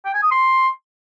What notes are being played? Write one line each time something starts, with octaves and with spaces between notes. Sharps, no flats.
G5
G#5
D#6
C6